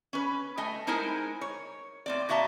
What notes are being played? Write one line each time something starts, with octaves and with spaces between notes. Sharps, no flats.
C#4 B4
A3 D#5 G#5
G#3 D#4 E4 A#4 C5 G#5
C#5
A2 C4 D5
A#2 F#4 D#5 E5 A5 A#5